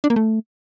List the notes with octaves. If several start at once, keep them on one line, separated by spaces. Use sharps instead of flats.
D4
A#3
A3